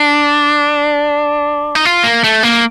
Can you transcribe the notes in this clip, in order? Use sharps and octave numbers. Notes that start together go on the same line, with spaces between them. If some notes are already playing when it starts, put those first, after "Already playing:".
Already playing: D4
D#4
F4
A#3
A3
A#3